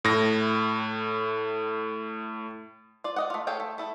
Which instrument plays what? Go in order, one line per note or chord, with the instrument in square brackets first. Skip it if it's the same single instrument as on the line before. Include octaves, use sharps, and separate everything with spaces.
[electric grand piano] A2 A#6
[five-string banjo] F4 D5
D5 D#5 F#5
A3 F4
G#4 A4 C#5 F5 G5
A3
A3 E4 A4